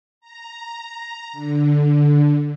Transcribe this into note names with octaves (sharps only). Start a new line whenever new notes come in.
A#5
D3